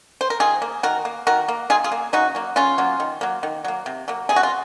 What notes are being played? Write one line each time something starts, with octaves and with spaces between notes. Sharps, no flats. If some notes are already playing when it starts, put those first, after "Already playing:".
C5
A#4
D#3 F4 G#4
A#3
D#3 F#4 A#4
A#3
D#3 F#4 A#4
A#3
D#3 F4 G#4
F4 G#4
A#3
C#3 D#4 F#4
F#3 A#3
C#3 C#4 F4
F#3 A#3
D#3
F#3 A#3
D#3
F#3 A#3
C3
F#3 A#3
C3 G#4
F#4
F4